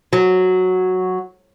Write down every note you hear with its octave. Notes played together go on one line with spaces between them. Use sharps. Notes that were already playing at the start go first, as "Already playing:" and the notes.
F#3